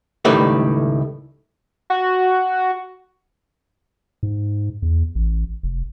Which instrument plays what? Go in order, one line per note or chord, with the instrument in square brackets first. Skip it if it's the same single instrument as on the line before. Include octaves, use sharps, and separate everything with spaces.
[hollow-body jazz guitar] C#2 A2 D#3 G3 A3 B4
[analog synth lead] F#4
[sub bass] G#2
E2
A1
F1